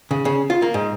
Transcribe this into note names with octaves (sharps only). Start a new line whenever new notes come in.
C#3
C#3
F4
A#3
G#2